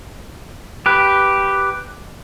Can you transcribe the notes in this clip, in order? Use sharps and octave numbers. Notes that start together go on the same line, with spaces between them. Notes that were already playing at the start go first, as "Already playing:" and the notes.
G4 B4